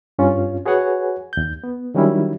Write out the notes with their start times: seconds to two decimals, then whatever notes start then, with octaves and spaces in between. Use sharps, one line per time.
0.19 G2 C#4 F4
0.66 F#4 G#4 B4 C#5 F#5 G#5
1.33 D#2 G6
1.64 B3
1.95 D#3 F#3 G3 C#4 D4 E4